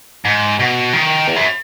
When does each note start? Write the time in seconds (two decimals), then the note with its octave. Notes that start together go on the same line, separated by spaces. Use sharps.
0.25 G#2
0.59 B2
0.93 D#3
1.27 E2
1.36 F#2